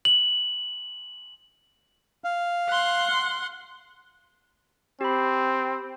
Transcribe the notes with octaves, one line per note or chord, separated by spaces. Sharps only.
F#7
F5
F#5 C6
C4 G4 B5